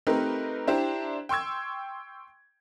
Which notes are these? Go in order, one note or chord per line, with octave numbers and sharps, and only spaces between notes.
A3 C4 D#4 G4 A#4 B4
D4 E4 G4 C5 A#5
G5 C6 C#6 E6 G#6